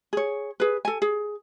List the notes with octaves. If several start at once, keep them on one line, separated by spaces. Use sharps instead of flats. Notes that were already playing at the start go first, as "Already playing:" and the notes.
G#4 C#5
G#4 B4
A4 G#5
G#4